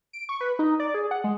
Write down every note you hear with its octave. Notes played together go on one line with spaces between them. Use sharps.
D7
C#6
B4
D#4
D5
G#4
F#5
G#3